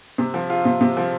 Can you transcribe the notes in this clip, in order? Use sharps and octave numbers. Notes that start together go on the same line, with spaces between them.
C3
F3
F4
C3
C3
F3